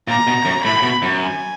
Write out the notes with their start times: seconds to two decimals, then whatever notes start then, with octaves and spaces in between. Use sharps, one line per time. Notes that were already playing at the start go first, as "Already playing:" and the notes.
0.08 A#2 A#5
0.27 B2
0.45 F#2
0.65 A2 B5
0.83 B2
1.02 F#2
1.21 G#5